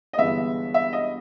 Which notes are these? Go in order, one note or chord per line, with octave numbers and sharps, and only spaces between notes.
D#5
G1 G2 E3 G#3 B3 E5
E5
D#5